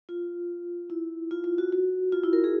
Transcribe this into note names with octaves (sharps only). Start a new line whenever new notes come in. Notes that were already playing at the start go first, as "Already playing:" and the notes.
F4
E4
F4
F4
F#4
F#4
F4
E4
A#4
G#4